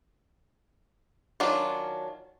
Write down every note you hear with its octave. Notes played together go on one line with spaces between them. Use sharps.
D#3 F#3 C#4 D4 F4